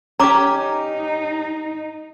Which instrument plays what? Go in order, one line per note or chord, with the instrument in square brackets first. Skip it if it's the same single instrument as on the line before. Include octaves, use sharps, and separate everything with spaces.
[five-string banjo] C#4 G4 [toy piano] A#5 D6
[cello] D#4